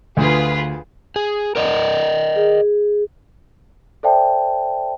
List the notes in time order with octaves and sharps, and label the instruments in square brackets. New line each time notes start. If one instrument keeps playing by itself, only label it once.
[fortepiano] D2 [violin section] F4 G#4 B4
[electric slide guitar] G#4
A#4 D5 D#5
[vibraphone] G#4
[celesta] A4 C5 D5 E5 G5 A5